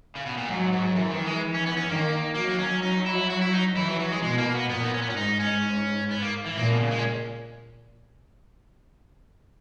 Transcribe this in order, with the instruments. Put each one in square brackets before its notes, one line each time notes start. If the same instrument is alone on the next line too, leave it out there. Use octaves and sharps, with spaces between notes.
[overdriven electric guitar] C#3
B2
A#2
[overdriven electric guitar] G#2 [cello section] F#3
[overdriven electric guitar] G#2
[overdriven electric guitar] F#2 [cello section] E3
[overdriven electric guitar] D#3
G#3
C#4
B3
C#4
[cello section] D#3 [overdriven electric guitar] A#3
[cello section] F#3 [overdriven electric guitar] A#3
[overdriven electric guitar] D#4
C#4
[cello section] F#3 [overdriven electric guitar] D#4
[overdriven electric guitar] E4
F#4
E4
D#4
[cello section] E3 [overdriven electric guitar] E4
[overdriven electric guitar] F#3
F#3
G#3
[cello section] B2 [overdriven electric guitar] G#3
[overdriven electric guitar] A#3
B3
[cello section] A#2 [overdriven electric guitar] B3
[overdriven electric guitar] D#4
C#4
B3
C#4
[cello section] G#2 [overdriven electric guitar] D#4
[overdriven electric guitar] C#4
B3
A#3
E3
[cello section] A#2 [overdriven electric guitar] A#3
[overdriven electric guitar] B2
C#3
G#3
C#4